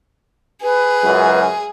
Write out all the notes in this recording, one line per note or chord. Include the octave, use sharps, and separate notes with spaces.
G#4 B4
C#2 F#2